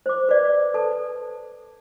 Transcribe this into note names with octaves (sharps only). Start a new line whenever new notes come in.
C5 D6
B4 D5
A4 B4 A5